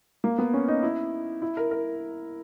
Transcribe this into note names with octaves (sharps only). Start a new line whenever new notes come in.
A#3
B3
C#4
D#4
E4
E4
A#4
A#4